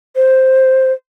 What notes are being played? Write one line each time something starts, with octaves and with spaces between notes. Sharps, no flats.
C5